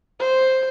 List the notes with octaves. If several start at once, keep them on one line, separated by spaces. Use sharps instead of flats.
C5